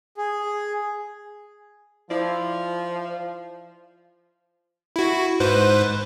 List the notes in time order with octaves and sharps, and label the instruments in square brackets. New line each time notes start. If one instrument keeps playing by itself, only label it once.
[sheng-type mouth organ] G#4
[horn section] F3 [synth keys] E4 D5
[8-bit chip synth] E4 F#4
G#2 B4 C5